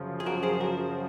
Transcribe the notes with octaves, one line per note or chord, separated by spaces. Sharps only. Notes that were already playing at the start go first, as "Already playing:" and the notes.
Already playing: F#2 C#3 F3
G#4
F#4 A#4
G#4 C5
F#4 A#4